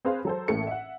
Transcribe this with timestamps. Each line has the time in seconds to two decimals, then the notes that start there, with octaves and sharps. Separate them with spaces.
0.05 C4 G#4 B4 C5 F5
0.25 F#3 A4 C5
0.48 A1 A2 A3 A#3 C#7
0.67 E5 F#5